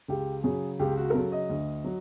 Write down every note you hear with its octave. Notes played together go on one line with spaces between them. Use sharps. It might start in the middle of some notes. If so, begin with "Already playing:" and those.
C#2 G4
C#3 F#3 G#4
C#2 G4
F#4
A#4
C#3 F#3 A4
D#5
D2
F#3